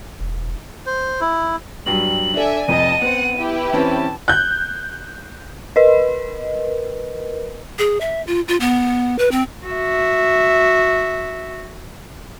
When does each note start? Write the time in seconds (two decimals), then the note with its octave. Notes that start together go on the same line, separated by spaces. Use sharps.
0.21 E1
0.86 C5
1.21 E4
1.86 G2 F#3 G3 F#7
2.34 D4 A4 D5 E5 G#5
2.68 F1 F2 D#5 A5 D#7
3.02 B3 C4 F#5
3.36 E4 G4 B4
3.73 E3 C4 C#4 A5
4.28 F#6 G6
5.76 A#4 B4 D#5
7.79 G#4
8.01 E5
8.27 F4
8.48 F4
8.60 B3
9.19 B4
9.31 C4
9.66 F#4 E5